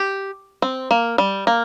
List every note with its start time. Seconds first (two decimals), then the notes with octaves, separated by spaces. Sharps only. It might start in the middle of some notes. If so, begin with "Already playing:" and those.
Already playing: G4
0.62 C4
0.91 A#3
1.18 G3
1.47 A#3